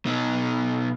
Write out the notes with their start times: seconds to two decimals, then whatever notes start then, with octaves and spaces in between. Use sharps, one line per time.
0.06 B2 D#4